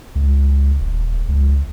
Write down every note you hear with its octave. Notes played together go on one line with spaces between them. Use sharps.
C#2
D#1
C#2